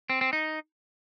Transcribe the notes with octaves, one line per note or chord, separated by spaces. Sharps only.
C4
C4
D#4